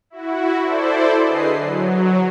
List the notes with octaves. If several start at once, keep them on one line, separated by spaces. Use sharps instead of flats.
E4 F#4
E4 A4 C5 D5
D3 G#4 B4 D#5 C7
F#3